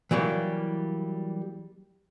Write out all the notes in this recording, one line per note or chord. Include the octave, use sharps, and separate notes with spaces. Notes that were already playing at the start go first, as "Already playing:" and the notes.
E3 F#3 G3 A#3